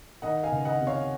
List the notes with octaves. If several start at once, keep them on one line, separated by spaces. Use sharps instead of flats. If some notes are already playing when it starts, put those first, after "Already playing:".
D#3 D#5 F#5
F5 G#5
C#2
D#5 F#5
C3
C#5 F5